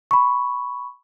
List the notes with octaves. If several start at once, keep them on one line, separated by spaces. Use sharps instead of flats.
B5 C#6